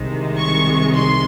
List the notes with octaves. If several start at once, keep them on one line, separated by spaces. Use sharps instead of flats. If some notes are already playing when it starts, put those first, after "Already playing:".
Already playing: C2 C3 D#3 G#3
C#6
C6